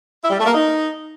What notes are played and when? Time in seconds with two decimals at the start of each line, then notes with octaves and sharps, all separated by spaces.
0.22 E4
0.30 G3
0.38 A3
0.46 A#3
0.54 D#4